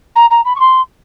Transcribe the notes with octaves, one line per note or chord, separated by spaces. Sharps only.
A#5
A#5
B5
C#6
C6